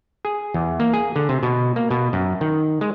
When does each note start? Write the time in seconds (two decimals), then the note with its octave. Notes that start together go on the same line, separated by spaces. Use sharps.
0.25 G#4
0.54 E2
0.80 A#3
0.93 G#4
1.16 D3
1.29 C3
1.43 B2
1.76 A#3
1.91 B2
2.13 F#2
2.41 D#3
2.81 G#3